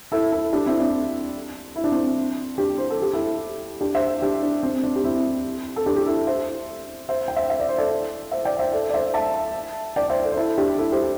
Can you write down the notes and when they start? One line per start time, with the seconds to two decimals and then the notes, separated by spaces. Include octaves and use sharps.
0.12 E4 A4
0.32 E4 A4
0.53 D4 G4
0.66 C4 E4
0.80 D4
1.76 E4
1.84 D4
1.92 C4 E4
2.58 D4 G4
2.78 C5
2.90 A4
3.02 G4
3.13 E4 A4
3.81 D4 G4
3.95 C5 E5
4.22 D4 G4
4.43 D4
4.63 C4
4.83 D4
4.96 G4
5.04 C4 E4
5.76 A4
5.86 D4 G4
5.96 G4
6.06 E4 A4
6.27 C5 E5
7.09 C5 E5
7.28 G5
7.36 C5 E5
7.50 E5
7.60 D5
7.69 C5
7.78 A4 D5
8.31 C5 E5
8.45 D5 G5
8.59 C5 E5
8.73 A4 D5
8.89 D5
8.94 C5 E5
9.14 E5 A5
9.96 D5 G5
10.10 C5 E5
10.23 A4 D5
10.32 C5
10.37 E4 A4
10.58 D4 G4
10.78 E4 A4
10.92 G4 C5